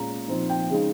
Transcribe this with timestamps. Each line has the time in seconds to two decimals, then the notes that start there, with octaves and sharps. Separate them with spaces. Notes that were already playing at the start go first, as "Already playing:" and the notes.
Already playing: A#2 G#3 C#4 A#5
0.28 A#2 F3 C4 D#4
0.50 G5
0.70 C#3 G#3 D#4